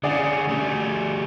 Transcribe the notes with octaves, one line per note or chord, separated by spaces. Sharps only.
D3 C#4 G#4 D5 F#5
G3 A3